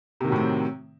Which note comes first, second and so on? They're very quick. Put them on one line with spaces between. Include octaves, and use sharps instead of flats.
C3 D#3 F#3 A2 C4